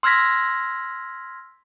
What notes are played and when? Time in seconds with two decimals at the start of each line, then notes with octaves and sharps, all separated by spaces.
0.03 C6 E6 F6 G#6 A#6 B6